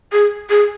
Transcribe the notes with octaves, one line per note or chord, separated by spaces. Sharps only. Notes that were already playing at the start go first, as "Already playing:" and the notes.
G#4
G#4